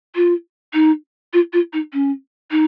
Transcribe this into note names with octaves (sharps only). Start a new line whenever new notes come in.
F4
D#4
F4
F4
D#4
C#4
D#4